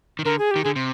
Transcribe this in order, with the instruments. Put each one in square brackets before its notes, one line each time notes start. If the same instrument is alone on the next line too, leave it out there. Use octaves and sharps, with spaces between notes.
[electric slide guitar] D#3
[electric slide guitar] D3 [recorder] A#4
[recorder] G#4
[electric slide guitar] D#3 [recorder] G4
[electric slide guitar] D3 [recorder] G#4
[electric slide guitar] C3